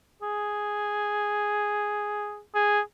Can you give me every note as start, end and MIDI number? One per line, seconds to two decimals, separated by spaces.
0.22 2.41 68
2.55 2.80 68